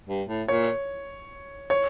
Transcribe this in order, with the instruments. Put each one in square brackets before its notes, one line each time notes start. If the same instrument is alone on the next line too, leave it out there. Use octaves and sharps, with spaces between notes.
[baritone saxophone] G2
A2
[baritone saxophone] A#2 [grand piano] C#5
[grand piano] C#5